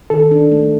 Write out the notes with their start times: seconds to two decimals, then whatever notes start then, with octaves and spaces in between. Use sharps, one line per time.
0.10 D#3 A4
0.31 D4
0.52 A3